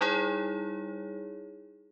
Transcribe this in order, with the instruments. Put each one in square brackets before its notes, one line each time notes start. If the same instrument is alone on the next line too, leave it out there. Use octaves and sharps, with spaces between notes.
[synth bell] G3 D#4 E4 G#4 C#5